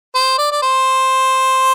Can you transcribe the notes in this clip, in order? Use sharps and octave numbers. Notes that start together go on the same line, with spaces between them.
C5
D5
D5
C5